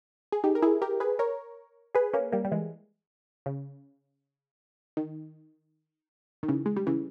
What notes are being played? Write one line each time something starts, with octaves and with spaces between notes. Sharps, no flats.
G#4
D#4 G4
A#4
E4 G#4
G4 A#4
G#4 B4
A#4 C#5
G#4 B4
A#3 C#4
G3 A#3
G3
E3 G#3
C#3
D#3
D#3
C#3 E3
G#3
G3
C#3 E3